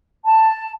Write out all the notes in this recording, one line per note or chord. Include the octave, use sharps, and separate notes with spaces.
A5